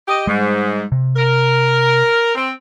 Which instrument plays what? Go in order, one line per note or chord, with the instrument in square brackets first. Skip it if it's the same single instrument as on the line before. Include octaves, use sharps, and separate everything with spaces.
[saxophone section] G4 D#5
[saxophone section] G#2 [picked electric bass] G3 G#3
[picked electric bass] C3
[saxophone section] A#4
C4